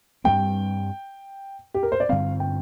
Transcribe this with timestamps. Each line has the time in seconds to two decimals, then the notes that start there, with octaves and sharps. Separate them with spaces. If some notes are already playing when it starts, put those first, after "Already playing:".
0.24 G2 G3 C4 G5
1.74 G4
1.83 A#4
1.92 C5
2.00 D5
2.09 G2 D3 G3 C4 F5
2.40 G5